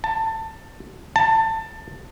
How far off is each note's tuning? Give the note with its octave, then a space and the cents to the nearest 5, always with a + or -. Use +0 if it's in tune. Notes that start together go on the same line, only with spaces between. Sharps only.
A5 +20
A5 +20